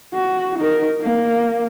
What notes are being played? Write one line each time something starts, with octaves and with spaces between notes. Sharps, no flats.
F#4
D#4 A#4
A#3